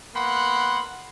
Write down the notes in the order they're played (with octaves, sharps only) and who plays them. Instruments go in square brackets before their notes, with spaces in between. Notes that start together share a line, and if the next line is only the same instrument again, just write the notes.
[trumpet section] A#3 B3 F#5 B5 C6